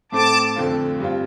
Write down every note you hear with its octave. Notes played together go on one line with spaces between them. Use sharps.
A2 A3 C4 A5 D6
F2 D3 A3 C4 F4
G2 G3 C4 F4